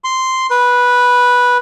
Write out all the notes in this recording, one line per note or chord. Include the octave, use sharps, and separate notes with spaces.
C6
B4